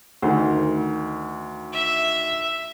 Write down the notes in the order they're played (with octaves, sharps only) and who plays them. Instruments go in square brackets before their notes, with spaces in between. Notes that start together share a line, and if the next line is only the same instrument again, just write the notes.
[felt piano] D2 D#3
[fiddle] E5